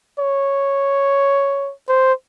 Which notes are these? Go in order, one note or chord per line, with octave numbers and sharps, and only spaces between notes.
C#5
C5